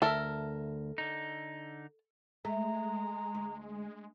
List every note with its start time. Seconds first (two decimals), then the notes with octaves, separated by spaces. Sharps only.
0.02 D2 A4 A#4 E5
0.98 D3 D#4
2.45 G#3 A3 A#5
3.35 D2